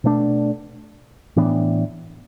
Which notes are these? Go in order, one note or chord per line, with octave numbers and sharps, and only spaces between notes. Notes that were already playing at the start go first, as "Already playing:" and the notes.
B2 A3 D4
A2 E3 B3 D4